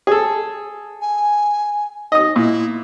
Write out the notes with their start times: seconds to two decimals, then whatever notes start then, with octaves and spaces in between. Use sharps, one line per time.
0.07 G#4 A4
1.01 G#5
2.12 D#4 D#5 D#6
2.36 A#2 E4